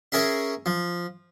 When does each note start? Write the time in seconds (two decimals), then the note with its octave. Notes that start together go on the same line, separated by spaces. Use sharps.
0.12 C#4 G#4 A#4 E5
0.66 F3